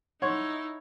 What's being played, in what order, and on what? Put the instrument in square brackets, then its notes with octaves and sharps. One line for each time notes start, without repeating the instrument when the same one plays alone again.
[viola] D#4 E4 [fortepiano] C#5 F#5 C6